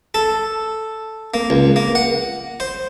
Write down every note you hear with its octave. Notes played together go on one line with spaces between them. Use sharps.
A4
A#3
C#2
A#3
F#5
C5